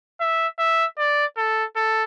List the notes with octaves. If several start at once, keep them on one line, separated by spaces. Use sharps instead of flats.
E5
E5
D5
A4
A4